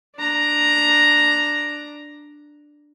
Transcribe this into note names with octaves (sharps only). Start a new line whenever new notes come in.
D4 A#5